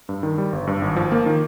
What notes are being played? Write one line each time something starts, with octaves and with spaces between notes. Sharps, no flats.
G2
D#3
G3
G1
G2
G#1
F3
A#3
D#3